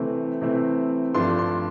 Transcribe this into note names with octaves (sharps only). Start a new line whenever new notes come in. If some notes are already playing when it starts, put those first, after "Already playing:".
Already playing: C3 E3 A3 C4
C3 E3 A3 C4
G2 F3 A3 D4 C6
C6